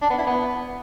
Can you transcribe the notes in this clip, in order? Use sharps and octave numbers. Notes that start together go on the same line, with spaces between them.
D4
B3
E4
B3